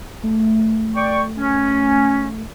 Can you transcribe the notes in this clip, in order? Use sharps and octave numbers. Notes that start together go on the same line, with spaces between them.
A3
D5 G5 C#6
C#4